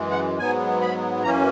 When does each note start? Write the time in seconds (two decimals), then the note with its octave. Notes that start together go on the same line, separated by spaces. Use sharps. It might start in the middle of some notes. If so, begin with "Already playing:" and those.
Already playing: F#2 E3 G#3
0.11 F#5
0.38 G#2 F#3 B3 G#5
0.81 B5
1.23 F#2 E3 A#3 C#4 A#5